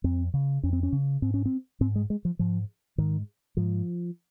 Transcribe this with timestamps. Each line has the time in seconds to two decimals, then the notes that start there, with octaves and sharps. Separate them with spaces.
0.04 F2 C4
0.34 C#3
0.63 F2 C#4
0.73 C4
0.83 C#4
0.92 C#3
1.22 G#2 C4
1.34 C#4
1.46 C4
1.81 G#2 C4
1.96 G#3
2.10 G#3
2.25 F3
2.39 G#2 F3
2.98 G#2 D#3
3.57 G#2 F3